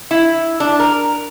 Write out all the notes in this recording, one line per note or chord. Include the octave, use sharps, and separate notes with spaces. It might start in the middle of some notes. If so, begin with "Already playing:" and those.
E4
D4
A#4